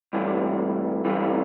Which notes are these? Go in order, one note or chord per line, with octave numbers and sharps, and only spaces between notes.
G2 E3 A3
G2 E3 A3